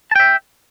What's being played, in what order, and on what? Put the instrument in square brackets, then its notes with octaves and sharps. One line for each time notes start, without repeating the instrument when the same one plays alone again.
[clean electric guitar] A5
G5
E5